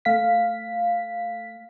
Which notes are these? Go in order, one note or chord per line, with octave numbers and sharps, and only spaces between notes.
A3 F5 B6